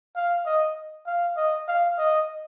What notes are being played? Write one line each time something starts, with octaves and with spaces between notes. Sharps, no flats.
F5
D#5
F5
D#5
F5
D#5